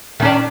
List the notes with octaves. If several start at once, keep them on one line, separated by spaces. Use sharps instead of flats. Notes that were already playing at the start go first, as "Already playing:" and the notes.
D#3 C#4 D4